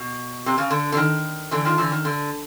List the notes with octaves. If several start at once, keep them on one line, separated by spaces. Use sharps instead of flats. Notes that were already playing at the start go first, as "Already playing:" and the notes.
Already playing: B2
C3
C#3
D3
D3
D#3
D3 E3
D#3 F3
D3 E3
D#3
D3